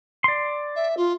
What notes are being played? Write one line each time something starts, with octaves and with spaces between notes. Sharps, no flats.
D5 C6
E5
F4